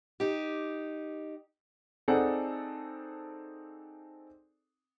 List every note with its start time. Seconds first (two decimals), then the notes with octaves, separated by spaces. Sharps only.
0.20 D#4 G4
2.08 C4 D#4 G#4 A4 D5 F#5